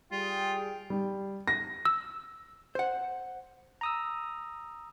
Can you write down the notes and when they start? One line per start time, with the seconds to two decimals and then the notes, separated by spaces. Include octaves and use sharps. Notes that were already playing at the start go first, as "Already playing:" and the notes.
0.12 G3 F4 G#4 G5
0.90 G3
1.48 A#6
1.85 E6
2.75 C5 F#5
3.81 A#5 D#6 E6